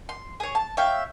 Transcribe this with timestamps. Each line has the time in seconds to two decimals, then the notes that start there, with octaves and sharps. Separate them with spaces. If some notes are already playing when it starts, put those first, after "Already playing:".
0.09 C6
0.40 G#4 C#5
0.55 A5
0.77 C#5 E5 F5 G5